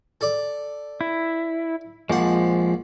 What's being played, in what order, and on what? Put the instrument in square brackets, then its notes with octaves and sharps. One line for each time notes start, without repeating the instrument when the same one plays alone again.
[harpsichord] A4 D5
[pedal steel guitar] E4
[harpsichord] A#1 F#5 [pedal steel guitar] F3 G#3